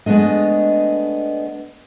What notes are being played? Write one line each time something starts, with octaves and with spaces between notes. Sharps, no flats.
G#3 A3 B3 D4 D#5